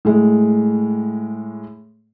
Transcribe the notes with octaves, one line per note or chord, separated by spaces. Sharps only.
A2 G#3